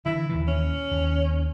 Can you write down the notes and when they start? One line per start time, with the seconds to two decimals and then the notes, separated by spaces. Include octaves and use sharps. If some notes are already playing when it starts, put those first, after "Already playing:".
0.06 D3 E3 E4
0.29 D#2 A#2 E3
0.48 C#4
0.91 D#2